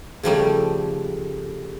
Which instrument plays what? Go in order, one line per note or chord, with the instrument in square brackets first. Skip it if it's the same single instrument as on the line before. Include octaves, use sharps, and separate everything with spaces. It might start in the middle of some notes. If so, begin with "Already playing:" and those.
[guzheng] C#3 F3 G3 A3